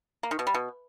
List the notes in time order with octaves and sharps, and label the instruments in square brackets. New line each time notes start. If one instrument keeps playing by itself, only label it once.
[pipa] A#3
D#3
B2
G3
B2